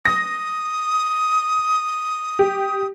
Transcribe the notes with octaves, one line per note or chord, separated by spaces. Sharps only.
D#6 A#6
G4